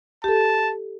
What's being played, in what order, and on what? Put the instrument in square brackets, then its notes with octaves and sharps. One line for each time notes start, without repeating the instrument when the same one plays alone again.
[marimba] G4 A4 [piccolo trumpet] A5